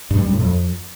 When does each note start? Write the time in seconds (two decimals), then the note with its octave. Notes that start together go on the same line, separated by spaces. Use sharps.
0.10 G2
0.18 G3
0.26 F#2
0.34 A2
0.41 F2